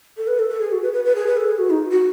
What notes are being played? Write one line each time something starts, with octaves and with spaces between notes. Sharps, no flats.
A4
B4
A4
A4
G#4
F#4
B4
B4
B4
G#4
B4
A4
G#4
F#4
D#4
F#4